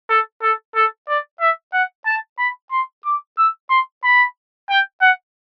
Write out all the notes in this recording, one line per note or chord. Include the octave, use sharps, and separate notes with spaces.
A4
A4
A4
D5
E5
F#5
A5
B5
C6
D6
E6
C6
B5
G5
F#5